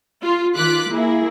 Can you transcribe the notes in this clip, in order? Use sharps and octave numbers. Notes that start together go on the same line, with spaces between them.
F4
D#3 F4 D6 F#6 B6
A#3 E4 G#4